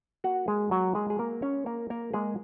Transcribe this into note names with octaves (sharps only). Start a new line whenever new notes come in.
A#3 F#4 F#5
G#3 G#4
F#3 A#3 F#4
G#3 G#4
G#4
A#3 A#4
C#4 C#5
A#3 A#4
A#3 A#4
G#3 A#3 G#4